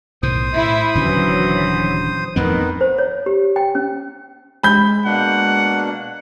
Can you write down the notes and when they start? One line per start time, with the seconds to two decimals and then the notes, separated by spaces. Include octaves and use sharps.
0.23 B1 A2 D#3 C5 D#6
0.54 A2 E4
0.95 D#1 D3 E3 F#3 C#4
2.36 A1 F2 D#3 B3 C4
2.81 C5
2.98 C#5
3.26 G4
3.56 G5
3.75 C#4
4.63 G#3 B5 G6
5.05 B2 A#3 D4 F#5